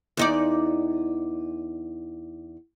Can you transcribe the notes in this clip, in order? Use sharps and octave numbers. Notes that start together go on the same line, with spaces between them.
E2 D#4 D5